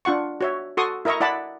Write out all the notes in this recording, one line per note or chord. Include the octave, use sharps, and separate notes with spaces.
D4 F4 F#5 C#6
F#4 C#5 E5
F#4 A4 C6 C#6 D#6
E4 A#4 D#5 E5 A#5 C#6
E4 D5 F#5 A5 B5